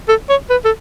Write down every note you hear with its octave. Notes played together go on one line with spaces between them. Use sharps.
A4
C#5
B4
A4